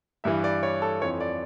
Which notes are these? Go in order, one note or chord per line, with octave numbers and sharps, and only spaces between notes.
G2 E3 E5
D5
C#5
A4
F2 E3 C#5
D5